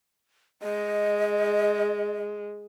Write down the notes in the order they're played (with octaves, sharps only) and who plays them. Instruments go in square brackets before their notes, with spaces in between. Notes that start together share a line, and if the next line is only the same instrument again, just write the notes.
[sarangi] G#3 [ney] D#5